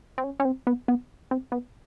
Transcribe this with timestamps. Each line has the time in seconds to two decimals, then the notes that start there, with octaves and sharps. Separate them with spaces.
0.18 C4
0.24 C#4
0.40 C#4
0.45 C4
0.67 B3
0.88 B3
1.31 C4
1.52 B3